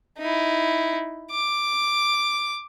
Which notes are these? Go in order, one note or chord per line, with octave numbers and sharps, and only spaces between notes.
D#4 E4
D6